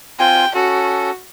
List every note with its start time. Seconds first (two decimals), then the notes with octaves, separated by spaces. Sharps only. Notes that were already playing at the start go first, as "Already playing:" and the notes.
0.19 C4 F4 G5 G#5
0.55 C#4 F#4 A4